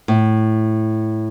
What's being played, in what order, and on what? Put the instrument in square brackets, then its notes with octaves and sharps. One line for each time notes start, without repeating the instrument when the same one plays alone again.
[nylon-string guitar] A2